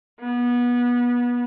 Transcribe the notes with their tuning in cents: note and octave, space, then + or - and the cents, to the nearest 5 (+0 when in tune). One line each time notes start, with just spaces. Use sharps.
B3 -25